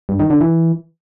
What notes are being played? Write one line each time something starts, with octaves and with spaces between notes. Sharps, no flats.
G2
D#3
D3
E3